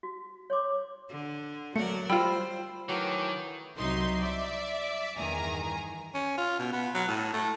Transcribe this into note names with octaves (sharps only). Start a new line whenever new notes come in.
F#4
C#5 C6 D6
D3
F#3 A3 A#4 D5 C#7
G3 F4 C5 G5 B5 E6
D#3 E3 F#3 A3 G5 D6
C2 F#3 D#4 E5 C6
D5 E5
E2 G2 D#3 G#5 A#5
C#4
F4
B2
B3
F#3
A2
A3